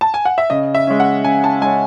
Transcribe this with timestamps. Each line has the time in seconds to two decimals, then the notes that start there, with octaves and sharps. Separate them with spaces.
0.01 A5
0.14 G#5
0.25 F#5
0.38 E5
0.50 C#3 D#5
0.75 E5
0.87 G#3 C#4
1.00 F#5
1.24 C#3 G#5
1.44 A5
1.61 G#3 G#5
1.65 C#4